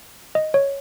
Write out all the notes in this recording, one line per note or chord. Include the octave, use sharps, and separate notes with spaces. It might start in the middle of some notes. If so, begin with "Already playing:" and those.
D#5
C#5